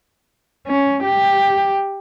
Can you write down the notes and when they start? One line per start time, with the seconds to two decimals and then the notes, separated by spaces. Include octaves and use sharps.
0.67 C#4
1.04 G4